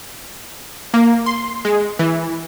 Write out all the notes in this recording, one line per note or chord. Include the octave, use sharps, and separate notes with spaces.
A#3
C6
G#3
E3